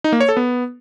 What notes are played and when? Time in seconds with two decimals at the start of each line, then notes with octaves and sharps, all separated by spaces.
0.04 D#4
0.12 A#3
0.21 C#5
0.29 A4
0.37 B3